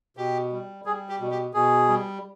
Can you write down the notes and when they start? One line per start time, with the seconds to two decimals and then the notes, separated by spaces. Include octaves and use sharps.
0.17 B2 G4
0.52 G3
0.85 G3 G#4
1.09 G4
1.20 B2
1.31 G4
1.54 B2 G#4
1.88 G3